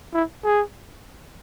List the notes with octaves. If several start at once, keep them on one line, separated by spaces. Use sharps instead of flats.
E4
G#4